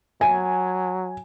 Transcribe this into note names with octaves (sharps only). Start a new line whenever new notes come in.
F#3 G#5